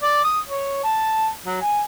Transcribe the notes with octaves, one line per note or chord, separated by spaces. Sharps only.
D5
D#6
C#5
A5
F#3
G#5